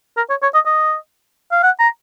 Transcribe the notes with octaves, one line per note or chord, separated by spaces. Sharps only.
A#4
C#5
C#5
D#5
D#5
F5
F#5
A#5